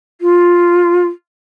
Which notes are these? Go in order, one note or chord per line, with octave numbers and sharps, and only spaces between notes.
F4